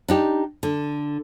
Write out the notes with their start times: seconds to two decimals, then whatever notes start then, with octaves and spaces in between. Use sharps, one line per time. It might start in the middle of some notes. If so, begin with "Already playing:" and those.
0.08 D4 D#4 G4
0.63 D3